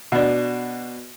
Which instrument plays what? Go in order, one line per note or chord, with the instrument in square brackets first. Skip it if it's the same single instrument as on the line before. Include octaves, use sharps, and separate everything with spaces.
[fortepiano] B2 D4